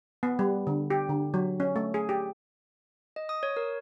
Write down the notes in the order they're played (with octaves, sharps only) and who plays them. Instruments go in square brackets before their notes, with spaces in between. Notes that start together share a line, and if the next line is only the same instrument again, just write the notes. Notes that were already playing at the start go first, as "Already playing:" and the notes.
[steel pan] B3
G3
D3
G4
D3
F#3
C#4
A3
G#4
G4
[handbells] D#5
D#6
C#5
A#4